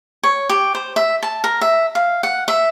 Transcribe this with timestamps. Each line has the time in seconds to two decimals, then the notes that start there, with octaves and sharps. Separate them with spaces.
0.23 C#5
0.49 G4
0.75 C5
0.96 E5
1.23 A5
1.44 A#4
1.61 E5
1.95 F5
2.23 F#5
2.48 E5